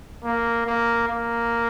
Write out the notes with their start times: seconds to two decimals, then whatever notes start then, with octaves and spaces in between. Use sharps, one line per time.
0.24 A#3
0.67 A#3
1.08 A#3